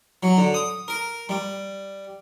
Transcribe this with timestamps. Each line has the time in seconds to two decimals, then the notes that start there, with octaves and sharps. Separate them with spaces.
0.23 F#3
0.37 D3
0.54 D#6
0.88 A#4
1.29 G3